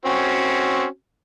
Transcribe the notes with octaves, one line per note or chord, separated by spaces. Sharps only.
C4 C#4 F#4